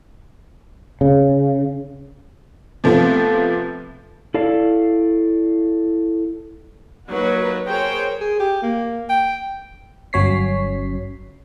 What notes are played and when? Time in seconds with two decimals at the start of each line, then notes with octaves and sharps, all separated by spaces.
1.01 C#3
2.84 C3 F3 A3 B3
4.34 E4 A4 D5 F5
7.10 F#3 A#3 D#4 F#4 B4
7.65 G#4 A#4 C5 C#5 G5
8.21 G#4
8.40 G4
8.63 A#3
9.10 G5
10.13 G1 F#3 C#4 C#5 B6 C7